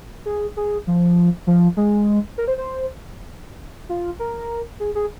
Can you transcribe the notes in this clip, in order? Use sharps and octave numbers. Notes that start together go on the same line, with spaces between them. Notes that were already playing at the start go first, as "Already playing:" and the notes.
G#4
G#4
F3
F3
G#3
A#4
C5
C5
F4
A#4
G#4
G#4